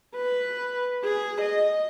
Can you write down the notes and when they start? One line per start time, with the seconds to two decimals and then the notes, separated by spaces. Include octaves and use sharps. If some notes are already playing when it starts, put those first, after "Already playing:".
0.16 B4
1.04 G#4
1.42 D#5